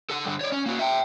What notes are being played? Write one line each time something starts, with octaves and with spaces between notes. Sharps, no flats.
A4 F#5
G2 D3
C#5 D5
C#4
A#3 F#4
E5 G5